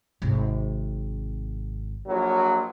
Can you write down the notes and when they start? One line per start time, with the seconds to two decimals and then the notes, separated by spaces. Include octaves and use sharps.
0.22 G#1 C3
2.08 A#1 A#2 F#3